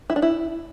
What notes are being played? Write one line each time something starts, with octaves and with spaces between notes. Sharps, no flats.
E4
D4
E4